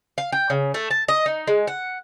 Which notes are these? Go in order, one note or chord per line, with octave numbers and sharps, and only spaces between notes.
F5
G5
C#3
A3
A5
D#5
D#4
G#3
F#5